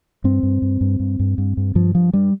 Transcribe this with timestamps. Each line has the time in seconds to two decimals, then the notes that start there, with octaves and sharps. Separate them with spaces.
0.24 G2 C4
0.43 G2
0.62 G2
0.81 G2
1.00 G2
1.20 G2
1.38 G2
1.57 G2
1.75 G2 F3
1.95 G2 F3
2.13 G2 G3